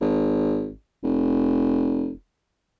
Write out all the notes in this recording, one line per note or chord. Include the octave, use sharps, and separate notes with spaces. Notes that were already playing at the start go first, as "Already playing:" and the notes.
G#1
F1